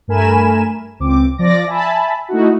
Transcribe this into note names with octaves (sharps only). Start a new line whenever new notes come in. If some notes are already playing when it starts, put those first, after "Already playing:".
G2 A3 A#4 G#5 B5 E7
C#2 C4 D6
F3 D5 D6 A#6
E5 G#5 A5 B5
A3 D#4 E4 F#4